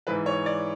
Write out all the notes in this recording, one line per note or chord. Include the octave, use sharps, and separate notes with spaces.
G#2 E3 B4
C#5
D5